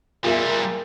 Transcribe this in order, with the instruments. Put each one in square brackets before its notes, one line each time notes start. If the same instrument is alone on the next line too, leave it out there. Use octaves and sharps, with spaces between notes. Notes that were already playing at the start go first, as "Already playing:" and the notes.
[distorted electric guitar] A#2 G3 [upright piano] F4 G#4 E5 [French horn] A#4